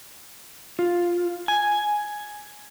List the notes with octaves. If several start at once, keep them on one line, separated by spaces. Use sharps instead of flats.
F4
G#5